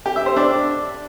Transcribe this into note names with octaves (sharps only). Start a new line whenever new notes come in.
G4
E5
C5
D4